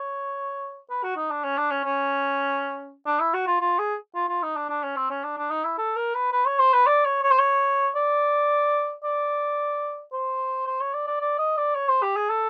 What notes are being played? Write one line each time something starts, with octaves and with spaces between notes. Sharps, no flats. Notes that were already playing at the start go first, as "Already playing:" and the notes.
Already playing: C#5
B4
F#4
D#4
D4
C#4
D4
C#4
C#4
D4
E4
F#4
F4
F4
G#4
F4
F4
D#4
D4
D4
C#4
C4
C#4
D4
D4
D#4
E4
A4
A#4
B4
B4
C#5
C5
B4
D5
C#5
C#5
C5
C#5
D5
D5
C5
C5
C#5
D5
D5
D5
D#5
D5
C#5
C5
G4
G#4
A4